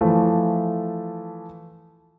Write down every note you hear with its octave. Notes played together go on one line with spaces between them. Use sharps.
E3 F3 A3